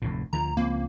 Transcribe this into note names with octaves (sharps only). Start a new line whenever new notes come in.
F1 D2 A2
D2 D3 F3 A#5
C#2 F3 A#3 C4